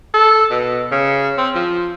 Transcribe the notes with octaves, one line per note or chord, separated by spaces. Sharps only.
A4
B2
C#3
C4
F3